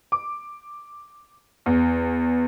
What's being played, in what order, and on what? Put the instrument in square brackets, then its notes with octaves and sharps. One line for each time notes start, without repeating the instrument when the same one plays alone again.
[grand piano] D6
E2